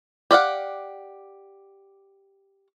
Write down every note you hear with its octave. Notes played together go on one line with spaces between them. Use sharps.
G4 D5 F5 F#5